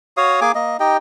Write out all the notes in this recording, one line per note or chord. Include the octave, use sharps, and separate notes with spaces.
F#4 C#5 F5 D#6
A#3 G#4 G#5 D6
A#3 D#5
D#4 G4 D#5 G5